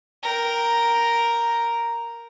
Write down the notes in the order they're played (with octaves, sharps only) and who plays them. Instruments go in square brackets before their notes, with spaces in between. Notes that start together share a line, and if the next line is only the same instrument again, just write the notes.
[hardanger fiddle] A#4 G5